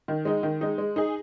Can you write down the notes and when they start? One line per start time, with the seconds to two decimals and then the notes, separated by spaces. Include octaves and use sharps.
0.08 D#3
0.25 G#3 D#4
0.43 D#3
0.61 G#3 D#4
0.78 G#3
0.96 D#4 G#4